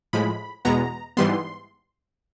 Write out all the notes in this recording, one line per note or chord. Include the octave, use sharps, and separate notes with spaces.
A2 F3 G#3 B5
E2 B2 G#3 B3 A#5
G#2 E3 G3 B3 C6